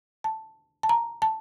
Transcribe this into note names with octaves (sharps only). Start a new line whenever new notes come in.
A5
A5
A#5
A5